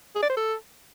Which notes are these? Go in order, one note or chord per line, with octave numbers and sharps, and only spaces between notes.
G#4
D5
C5
A4